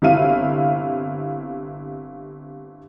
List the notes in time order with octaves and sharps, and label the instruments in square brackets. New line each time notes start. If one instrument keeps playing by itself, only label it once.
[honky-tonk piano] G1 C3 E4 F5 D#7